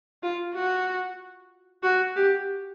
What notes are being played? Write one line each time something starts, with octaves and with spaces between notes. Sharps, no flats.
F4
F#4
F#4
G4